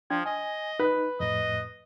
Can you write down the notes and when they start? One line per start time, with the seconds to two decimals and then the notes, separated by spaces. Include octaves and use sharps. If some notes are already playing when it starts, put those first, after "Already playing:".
0.10 F3 D4 G5 G#6
0.26 D#5 G#5
0.80 D#4 B4
1.20 F2 A2 D#5